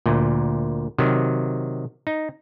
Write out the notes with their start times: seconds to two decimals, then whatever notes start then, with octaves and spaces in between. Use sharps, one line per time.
0.06 D2 A#2
0.98 C3 D#3 F#3
2.07 D#4